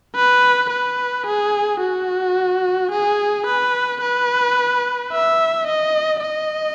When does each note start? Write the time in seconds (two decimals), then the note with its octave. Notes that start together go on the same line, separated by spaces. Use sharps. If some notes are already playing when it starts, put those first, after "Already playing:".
0.15 B4
0.70 B4
1.26 G#4
1.80 F#4
2.91 G#4
3.46 B4
4.02 B4
5.12 E5
5.67 D#5
6.22 D#5